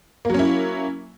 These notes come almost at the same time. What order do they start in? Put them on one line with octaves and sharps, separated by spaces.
A#3 F#3 C#4 E4